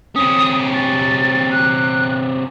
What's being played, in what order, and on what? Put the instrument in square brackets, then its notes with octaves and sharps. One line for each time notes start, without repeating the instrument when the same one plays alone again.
[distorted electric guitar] C3 C#4 [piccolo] D#6
[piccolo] A6
F#6